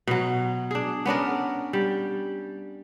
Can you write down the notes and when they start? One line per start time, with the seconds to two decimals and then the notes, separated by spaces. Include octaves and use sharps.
0.07 B2 F#3
0.71 D4 G#4
1.06 B3 C#4 D4 A#4
1.73 G3